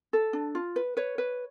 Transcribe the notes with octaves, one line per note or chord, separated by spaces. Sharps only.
A4
D4
F4
B4
B4 C#5
B4